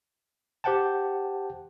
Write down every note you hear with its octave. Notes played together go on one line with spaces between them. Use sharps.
G4 C5 F#5 G5 A5